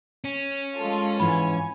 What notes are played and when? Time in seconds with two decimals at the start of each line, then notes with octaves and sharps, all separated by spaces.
0.24 C#4
0.77 G#3 F4 A4
1.20 G#2 E3 G#5 B5